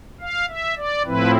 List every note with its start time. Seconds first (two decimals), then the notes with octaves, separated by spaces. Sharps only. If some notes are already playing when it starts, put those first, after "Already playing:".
0.20 F5
0.49 E5
0.77 D5
1.05 A2 F3 C4 E4 B4